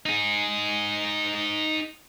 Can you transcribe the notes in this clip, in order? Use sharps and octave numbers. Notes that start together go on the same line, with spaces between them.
D#4 G#4